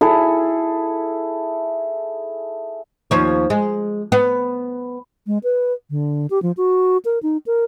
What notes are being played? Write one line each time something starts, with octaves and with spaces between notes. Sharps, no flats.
E4 G#4 A4
D#2 F3 C#5
G#3
B3
G#3
B4
D3
G4
F3
F#4
A#4
D#4
A#4